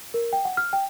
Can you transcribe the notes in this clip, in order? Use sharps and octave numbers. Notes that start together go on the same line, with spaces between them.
A#4
G5
F#5
F6
G5